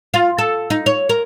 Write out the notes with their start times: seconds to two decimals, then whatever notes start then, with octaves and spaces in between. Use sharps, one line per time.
0.14 F4
0.38 A4
0.70 D#4
0.86 C#5
1.09 A#4